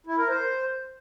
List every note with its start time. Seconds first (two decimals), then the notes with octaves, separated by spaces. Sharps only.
0.07 E4
0.18 A#4
0.29 C5